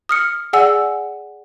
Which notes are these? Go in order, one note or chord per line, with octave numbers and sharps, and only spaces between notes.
D#6 F6 C#7
G#4 D5 F#5 G#5 E6